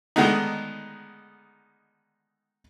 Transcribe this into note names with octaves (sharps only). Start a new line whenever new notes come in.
D3 D#3 G#3 A3 B3 D#4